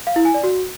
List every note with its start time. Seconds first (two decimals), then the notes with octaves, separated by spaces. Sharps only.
0.07 F5
0.16 E4
0.25 G#5
0.34 D5
0.44 F#4